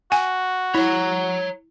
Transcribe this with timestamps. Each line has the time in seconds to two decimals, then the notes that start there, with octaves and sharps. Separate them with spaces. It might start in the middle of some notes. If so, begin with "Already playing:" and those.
0.12 F#4 G#5
0.75 E4 C#5 A#5